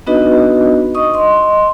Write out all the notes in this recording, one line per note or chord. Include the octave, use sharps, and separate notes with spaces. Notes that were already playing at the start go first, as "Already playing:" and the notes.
B3 D4 D#4 F#4 B4 D#5
D#5 C#6 D#6
D#5 C6